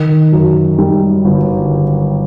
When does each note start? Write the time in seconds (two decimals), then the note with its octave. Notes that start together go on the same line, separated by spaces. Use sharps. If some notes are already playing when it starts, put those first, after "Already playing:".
Already playing: D#3
0.32 F#2
0.78 G3
1.25 G1